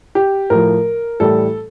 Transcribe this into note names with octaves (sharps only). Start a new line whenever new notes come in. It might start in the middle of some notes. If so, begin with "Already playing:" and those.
G4
A2 F3 A#4
A2 E3 G3 A4